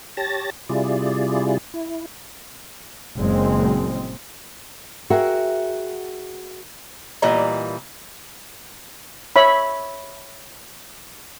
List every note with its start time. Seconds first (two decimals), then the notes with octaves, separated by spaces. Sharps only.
0.17 G4 C#5 A5 A6 A#6
0.69 C3 G3 E4 F4 G#4 D5
1.74 E4
3.17 F#1 A#2 G#3 C4
5.10 F#4 G#4 A#4 E5 F#5 G5
7.22 A#2 E3 G3 D#5 A#5
9.36 C#5 E5 B5